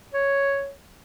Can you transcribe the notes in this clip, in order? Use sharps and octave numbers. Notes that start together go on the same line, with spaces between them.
C#5